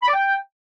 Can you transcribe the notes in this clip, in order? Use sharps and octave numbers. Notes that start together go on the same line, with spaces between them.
B5
D5
G5